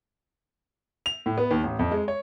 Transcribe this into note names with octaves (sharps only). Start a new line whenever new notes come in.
F7
A2
B3
D#2
A1
F2
G#3
C#5